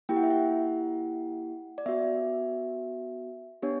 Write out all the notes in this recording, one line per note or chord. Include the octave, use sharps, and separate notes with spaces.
A#3 E4 G4 G5
F#5
E5
F#5
D5
B3 F#4 E5
B3 D4 G4 C#5